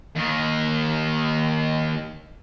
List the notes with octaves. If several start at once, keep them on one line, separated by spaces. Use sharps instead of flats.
D#2 D#3